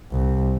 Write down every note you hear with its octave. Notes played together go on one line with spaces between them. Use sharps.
C2